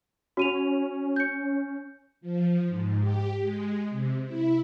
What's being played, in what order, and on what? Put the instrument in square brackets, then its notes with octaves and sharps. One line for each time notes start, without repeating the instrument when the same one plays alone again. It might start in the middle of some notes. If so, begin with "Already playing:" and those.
[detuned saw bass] C#4 [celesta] F#4 D#7 F7
[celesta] G6 C#7
[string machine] F3
G#2
G4
G#3
C3
E4